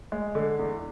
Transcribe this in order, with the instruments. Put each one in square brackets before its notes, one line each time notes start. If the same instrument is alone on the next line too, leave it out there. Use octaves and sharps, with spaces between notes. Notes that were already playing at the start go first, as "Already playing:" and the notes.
[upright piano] G#3
D3
E2